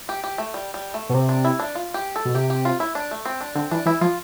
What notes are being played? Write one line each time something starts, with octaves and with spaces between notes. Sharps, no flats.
G4
G4
A3
G3
G3
A3
B2
C3
D4
E4
D4
F4
G4
A4
B2
C3 G4
G4
F4
E4
D4
A3
C4
D4
D3 C4
E3 D4
E3 E4
F3 F4